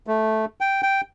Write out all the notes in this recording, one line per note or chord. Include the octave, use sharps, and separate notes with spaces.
A3
G5
G5